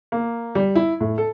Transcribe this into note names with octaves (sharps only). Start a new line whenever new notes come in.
A#3
G3
E4
A2
A4